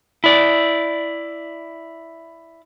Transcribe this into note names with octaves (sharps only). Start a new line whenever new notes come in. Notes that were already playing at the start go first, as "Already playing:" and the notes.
E4 D5